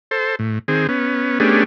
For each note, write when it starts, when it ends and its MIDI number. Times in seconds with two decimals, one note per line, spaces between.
0.11 0.35 69
0.11 0.35 72
0.39 0.59 45
0.68 0.87 51
0.68 0.87 60
0.68 0.87 68
0.89 1.40 59
0.89 1.40 61
1.40 1.64 57
1.40 1.64 59
1.40 1.64 61
1.40 1.64 62
1.40 1.64 67
1.40 1.64 68